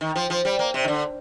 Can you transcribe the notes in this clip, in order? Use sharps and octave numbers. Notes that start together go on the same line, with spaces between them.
D#3
F3
F3
G3
A#3
C3
D#3
D3